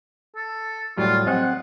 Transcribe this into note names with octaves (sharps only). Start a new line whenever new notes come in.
A4
A2 F#3 G3 F4
C4 D#5 F#5 G#5